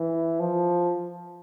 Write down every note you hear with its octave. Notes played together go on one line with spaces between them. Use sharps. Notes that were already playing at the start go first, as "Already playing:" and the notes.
Already playing: E3
F3